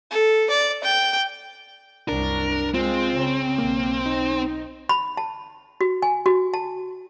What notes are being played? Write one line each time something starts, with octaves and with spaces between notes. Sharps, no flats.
A4
D5
G5
C2 F#2 D4 A#4
G#3 C4 F4
C#3
B1 A#3
D#4
B5
A5
F#4
G#5
F#4
A5